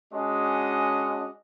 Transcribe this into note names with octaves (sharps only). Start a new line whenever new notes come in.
G#3 C#4 D4 F#4 D#5